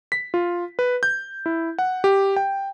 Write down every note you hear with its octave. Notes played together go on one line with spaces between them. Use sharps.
B6
F4
B4
G6
E4
F#5
G4
G5